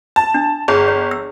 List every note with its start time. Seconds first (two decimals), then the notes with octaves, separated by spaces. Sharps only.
0.16 A5
0.34 D4
0.68 G1 G#4 C#5 A5
0.88 C#5
1.11 E6